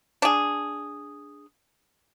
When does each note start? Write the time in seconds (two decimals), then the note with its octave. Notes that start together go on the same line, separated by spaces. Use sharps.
0.22 D4 G#4